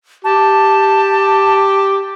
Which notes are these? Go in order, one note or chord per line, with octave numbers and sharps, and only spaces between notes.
G4 A5